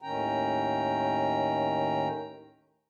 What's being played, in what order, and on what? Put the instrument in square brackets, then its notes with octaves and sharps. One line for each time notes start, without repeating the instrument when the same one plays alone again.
[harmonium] D#2 A2 D#3 C#4 G5 A#5